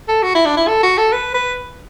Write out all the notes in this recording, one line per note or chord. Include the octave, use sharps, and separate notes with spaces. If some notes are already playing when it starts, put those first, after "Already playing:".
A4
F#4
E4
D4
E4
A4
F#4
A4
B4
B4